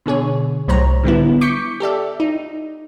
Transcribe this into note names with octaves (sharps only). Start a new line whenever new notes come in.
B2 D3 G#4 C#5
C2 A2 F#3 C5 C#5 A#5
D3 G3 B3 E4
C#6 D6 G6 B6 C#7
G4 A4 D5 E5
D#4